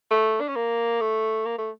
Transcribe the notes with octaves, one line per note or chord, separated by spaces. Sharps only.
A3
D4
C#4
A#3
A3
A#3
A3